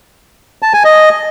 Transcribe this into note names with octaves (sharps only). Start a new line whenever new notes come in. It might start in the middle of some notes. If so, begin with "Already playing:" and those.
A5
G#5
D#5